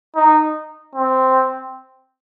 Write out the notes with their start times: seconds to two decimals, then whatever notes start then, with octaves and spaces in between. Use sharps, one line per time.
0.16 D#4
0.95 C4